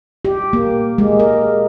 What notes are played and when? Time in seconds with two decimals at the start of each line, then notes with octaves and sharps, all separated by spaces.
0.25 G4
0.53 A#3
0.98 G#3
1.20 A#4